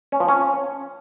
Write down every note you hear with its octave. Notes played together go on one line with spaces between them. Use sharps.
C#4
F3
C#4